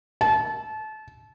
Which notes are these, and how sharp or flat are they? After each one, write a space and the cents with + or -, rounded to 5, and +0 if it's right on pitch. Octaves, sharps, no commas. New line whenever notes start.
A5 -30